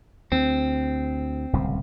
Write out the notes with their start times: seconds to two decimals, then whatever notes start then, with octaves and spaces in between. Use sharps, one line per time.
0.32 D2 C4
1.53 D1 C2 C#3